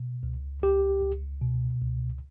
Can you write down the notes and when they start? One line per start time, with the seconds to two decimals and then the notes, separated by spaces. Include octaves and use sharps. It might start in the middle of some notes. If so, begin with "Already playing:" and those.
Already playing: B2
0.23 C#2
0.63 C#2 G4
1.02 C#2
1.42 B2
1.82 C#2